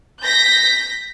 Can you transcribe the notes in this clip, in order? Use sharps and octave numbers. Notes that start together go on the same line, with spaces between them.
G6 A#6 B6